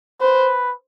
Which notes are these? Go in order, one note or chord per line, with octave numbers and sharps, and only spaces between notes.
B4 C5